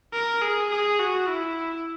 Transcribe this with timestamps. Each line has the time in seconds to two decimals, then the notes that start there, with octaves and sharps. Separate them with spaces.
0.13 A#4
0.42 G#4
0.70 G#4
0.99 F#4
1.28 E4